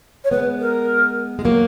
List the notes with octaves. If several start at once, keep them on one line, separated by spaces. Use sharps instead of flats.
C#5
G#3 B3 B4
A#4
G#3
F#3 A#3